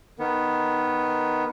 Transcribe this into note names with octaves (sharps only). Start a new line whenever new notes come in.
D#3 B3